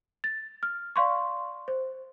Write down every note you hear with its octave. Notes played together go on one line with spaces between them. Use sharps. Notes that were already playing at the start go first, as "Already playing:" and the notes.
A6
F6
D5 F5 C6 C#6
C5